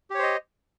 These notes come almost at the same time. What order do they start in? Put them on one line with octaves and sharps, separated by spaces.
G4 C#5 C5 D#5